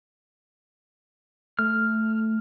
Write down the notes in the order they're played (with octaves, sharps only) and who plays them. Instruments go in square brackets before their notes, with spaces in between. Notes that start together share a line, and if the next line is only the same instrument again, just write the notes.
[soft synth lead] A3 [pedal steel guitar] F6